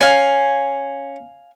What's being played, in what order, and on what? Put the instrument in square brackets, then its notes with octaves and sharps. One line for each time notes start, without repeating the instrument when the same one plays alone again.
[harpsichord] C#4 [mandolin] F5 G#5